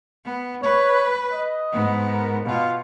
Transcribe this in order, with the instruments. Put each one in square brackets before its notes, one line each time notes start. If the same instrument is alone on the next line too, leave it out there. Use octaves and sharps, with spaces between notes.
[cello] B3
[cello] B4 [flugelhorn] C#5
[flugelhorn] D#5
[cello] G#2 B3
[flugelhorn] A#4
[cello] B2 F4 [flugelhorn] F5